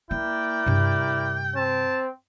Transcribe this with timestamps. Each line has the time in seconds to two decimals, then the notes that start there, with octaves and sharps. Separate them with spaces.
0.11 A#3 E4 A#4 D5 G5
0.66 G2 C3
1.55 C4 A5